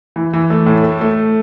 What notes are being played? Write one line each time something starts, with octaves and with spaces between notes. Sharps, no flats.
E3
E3
A3
A2
A3
A3